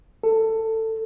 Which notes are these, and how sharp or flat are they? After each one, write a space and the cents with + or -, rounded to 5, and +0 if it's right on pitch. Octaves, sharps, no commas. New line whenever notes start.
A4 +20